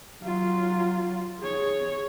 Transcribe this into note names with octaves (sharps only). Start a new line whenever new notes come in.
F#3 F4
G#4 C#5